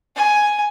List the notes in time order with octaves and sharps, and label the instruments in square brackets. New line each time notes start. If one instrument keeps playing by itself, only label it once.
[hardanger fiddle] G#5